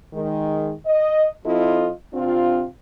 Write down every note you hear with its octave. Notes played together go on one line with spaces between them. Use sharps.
D#3 G#3
D#5
F3 C4 E4 F4 A4 D#5
C3 C4 D4 F4